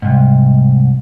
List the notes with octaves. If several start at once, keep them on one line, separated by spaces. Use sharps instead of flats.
C2 G#2